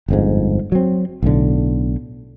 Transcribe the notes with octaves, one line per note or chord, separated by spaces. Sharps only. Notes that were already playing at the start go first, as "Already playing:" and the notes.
G1 F2 G#2
F#3 C4
B1 A2 D3